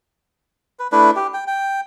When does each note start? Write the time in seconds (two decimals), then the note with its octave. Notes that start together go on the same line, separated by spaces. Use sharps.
0.79 B4
0.92 A3 D4 E4 B4
1.16 G4
1.34 G5
1.47 G5